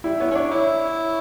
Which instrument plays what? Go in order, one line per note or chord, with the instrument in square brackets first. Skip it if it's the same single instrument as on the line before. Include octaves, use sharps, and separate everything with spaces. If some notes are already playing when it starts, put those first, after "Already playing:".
[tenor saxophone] G3 [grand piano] E4
[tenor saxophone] B3 [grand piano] C#5
[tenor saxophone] C#4
[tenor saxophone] D4 [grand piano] C#5
[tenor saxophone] E4